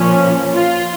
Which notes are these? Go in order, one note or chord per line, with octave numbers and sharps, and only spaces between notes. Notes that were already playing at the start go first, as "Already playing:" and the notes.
Already playing: A#2 F3 C#4
F4